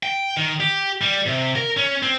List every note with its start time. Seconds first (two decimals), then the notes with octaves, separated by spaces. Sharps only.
0.03 G5
0.37 D#3
0.60 G4
1.01 G3
1.26 C3
1.56 A#4
1.77 C#4
2.03 C4